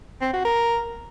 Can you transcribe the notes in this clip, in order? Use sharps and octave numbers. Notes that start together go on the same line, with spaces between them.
C4
F#4
A#4